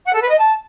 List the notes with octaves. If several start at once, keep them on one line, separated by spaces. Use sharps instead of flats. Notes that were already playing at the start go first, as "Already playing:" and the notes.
F#5
A4
B4
D#5
A5